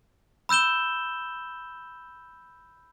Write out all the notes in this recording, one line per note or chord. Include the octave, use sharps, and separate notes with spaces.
B5 E6 G6 E7 G7